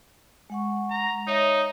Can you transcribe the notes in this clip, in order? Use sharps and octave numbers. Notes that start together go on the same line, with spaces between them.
G#3 F#5 C#6
A#5
D#4 C#5 E5